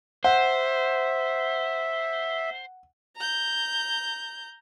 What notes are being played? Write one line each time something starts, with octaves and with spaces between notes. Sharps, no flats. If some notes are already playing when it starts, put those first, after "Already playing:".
C5 E5 F#5
A#5 G6